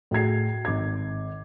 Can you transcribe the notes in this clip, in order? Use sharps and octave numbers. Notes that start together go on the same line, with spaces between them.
A2 F#4 G#4 G#6 C7
G#1 D6 G#6